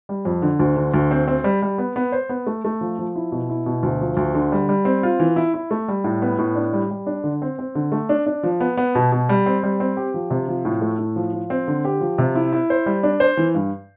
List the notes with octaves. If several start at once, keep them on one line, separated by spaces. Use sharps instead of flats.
G3
F2
D3
D2
D3
D2
C4
C4
G3
G3
B3
B3
C5
B3
A3
A3
F3
F3
E4
B2
E4
B2
D2
F3
D2
D3
G3
G3
C4
F4
E3
E4
E4
A3
G3
A2
B3
A2
D4
G3
G3
D4
D3
C4
C4
D3
A3
D4
D4
F3
B3
B3
B2
B2
G3
C4
G3
C4
G4
F3
C3
F3
A2
A3
A2
F3
F3
C4
D3
G4
F3
C3
E4
E4
C5
G3
D4
C5
E3
G2